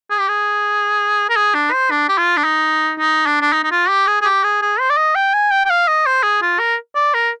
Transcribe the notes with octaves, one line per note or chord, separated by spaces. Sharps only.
G#4
G4
G#4
A#4
G#4
D4
C5
D4
G4
F4
D4
D#4
D#4
D4
D4
D#4
D#4
F4
G4
G#4
G#4
G4
G#4
G#4
C5
D5
D#5
G5
G#5
G5
G5
F5
D#5
C5
G#4
F4
A#4
D5
A#4